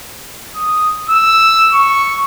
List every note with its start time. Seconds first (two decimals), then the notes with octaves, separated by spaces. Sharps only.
0.56 D#6
1.10 E6
1.72 C#6